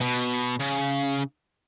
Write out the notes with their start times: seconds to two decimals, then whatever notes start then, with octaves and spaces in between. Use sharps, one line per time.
0.01 B2
0.60 C#3